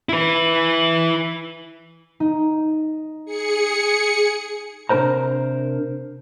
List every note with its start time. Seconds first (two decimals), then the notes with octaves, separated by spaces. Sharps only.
0.09 E4 B4
2.20 D#4
3.25 G#4 C#7
4.89 C3 D4 F4 A#4 C5 A#5